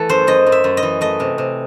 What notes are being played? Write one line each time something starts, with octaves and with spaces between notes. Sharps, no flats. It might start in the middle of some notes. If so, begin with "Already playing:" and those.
Already playing: E3 A3 A4
F#2 C5
F#2 D#5
F#2
E5
F#2
D#5
E3
A3 D#5
C3
C3